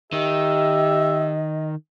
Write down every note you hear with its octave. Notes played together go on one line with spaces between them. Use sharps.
D#3 G4 D#5 E5